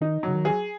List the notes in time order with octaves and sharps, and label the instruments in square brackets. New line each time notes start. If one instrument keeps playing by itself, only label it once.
[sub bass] D#3 [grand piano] D#4
[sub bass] C#3 [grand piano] F#3
[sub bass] D#3
[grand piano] G#4